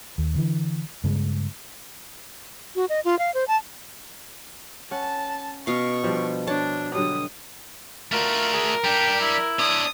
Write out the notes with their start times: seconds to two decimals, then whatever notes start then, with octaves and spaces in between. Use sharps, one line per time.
0.18 D#2
0.35 D3 E3
1.04 G2 C#3 G#3
2.76 F#4
2.89 D#5
3.05 F4
3.19 F5
3.34 C5
3.48 A5
4.91 C#4 F#5 A5
5.67 B2 F5 C#6
6.04 F3 G3 D4
6.47 D4 C#5 A5
6.94 D3 F#3 G3 D#6
8.12 A3 F4 F#4 A#4
8.53 G#4
8.84 G3 D4 G5
9.21 E4
9.59 D4 C#5 D#6